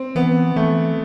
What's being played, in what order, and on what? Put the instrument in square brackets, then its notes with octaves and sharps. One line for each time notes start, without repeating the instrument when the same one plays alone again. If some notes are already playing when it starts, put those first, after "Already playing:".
Already playing: [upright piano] C4
[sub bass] E3 [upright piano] B3
[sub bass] E3 [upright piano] A3